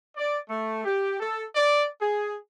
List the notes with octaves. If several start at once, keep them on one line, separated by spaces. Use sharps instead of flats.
D5
A3
G4
A4
D5
G#4